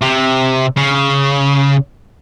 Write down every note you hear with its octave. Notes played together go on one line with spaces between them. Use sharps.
C3
C#3